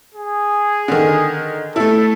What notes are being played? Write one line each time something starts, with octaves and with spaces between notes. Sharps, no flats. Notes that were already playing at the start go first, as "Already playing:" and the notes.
G#4
D3 D#3
A3 E4 A4